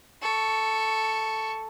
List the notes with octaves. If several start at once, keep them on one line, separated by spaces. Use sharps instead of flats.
A4 C#6